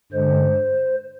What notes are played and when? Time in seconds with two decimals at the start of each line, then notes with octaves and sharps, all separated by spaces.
0.12 G2 D3 G#3 C5